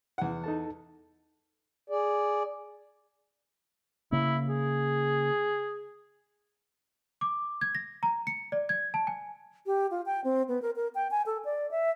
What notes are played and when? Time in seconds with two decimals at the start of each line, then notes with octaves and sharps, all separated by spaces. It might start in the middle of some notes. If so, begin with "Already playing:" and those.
0.18 E2 F#5
0.44 D#4 A4 A5
1.90 G#4 D5
4.12 C#3 A#3 E4
4.49 G#4
7.21 D6
7.61 G#6
7.75 A#6
8.03 A#5
8.27 C#7
8.52 D5
8.69 G#6
8.94 A5
9.07 G#5
9.66 G4
9.91 F4
10.06 G5
10.24 C4
10.48 B3
10.62 A#4
10.76 A#4
10.95 G5
11.11 G#5
11.26 A4
11.45 D5
11.71 E5